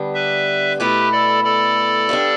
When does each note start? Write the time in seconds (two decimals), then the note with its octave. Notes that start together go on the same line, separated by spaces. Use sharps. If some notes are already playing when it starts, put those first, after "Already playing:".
Already playing: D3 G3 B3 D4
0.14 B4 E5
0.79 B2 A3 E4 G4 B4
1.12 A4 D5
1.44 A4 D5
2.09 G2 G3 B3 D4